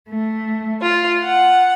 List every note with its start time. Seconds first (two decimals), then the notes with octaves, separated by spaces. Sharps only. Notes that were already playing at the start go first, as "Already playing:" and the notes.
0.10 A3
0.81 F4
1.22 F#5